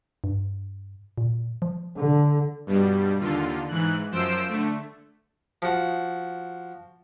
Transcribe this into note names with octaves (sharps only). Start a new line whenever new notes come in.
G2
A#2
F3
D3
G2 B2 G3
D#2 D3 F4
G#2 E3 F#6
F#2 F3 C5 E6 D7
D3 A3
F3 F#4